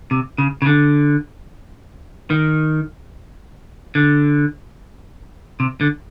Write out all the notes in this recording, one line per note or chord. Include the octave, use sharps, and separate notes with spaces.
C3
C#3
C#3
D3
D#3
D3
C3
D3